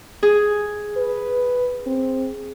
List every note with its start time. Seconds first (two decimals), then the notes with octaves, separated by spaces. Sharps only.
0.23 G#4
0.97 B4
1.87 C4